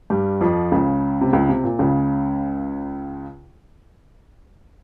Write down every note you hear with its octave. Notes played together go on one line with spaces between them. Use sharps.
G2 G3
F2 F3
C#2 C#3
C3
C#2 C#3
C3
A#2
C#2 C#3